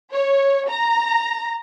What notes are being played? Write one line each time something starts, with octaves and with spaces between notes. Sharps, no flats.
C#5
A#5